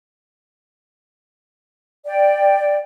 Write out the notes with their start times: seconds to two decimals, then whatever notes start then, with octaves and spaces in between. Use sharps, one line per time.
2.06 D5 G5